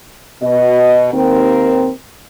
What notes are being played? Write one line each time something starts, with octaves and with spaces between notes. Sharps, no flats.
B2 D#5
D#2 C4 A#4